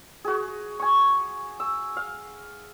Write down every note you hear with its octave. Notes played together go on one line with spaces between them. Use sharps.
F#4 G#4
G#5 C#6
E6
F5